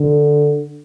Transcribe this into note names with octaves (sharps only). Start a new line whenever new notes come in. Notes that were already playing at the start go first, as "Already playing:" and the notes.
Already playing: D3